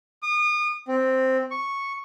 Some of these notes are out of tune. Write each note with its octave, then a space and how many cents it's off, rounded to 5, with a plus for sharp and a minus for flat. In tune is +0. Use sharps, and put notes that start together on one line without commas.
D#6 -35
C4 +0
C#6 -5